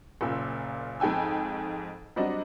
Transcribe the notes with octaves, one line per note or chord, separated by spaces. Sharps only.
F#1 A#2 E6
F2 G#2 G5 G#5 E6
F#3 G3 C4 D4 F#4 D#5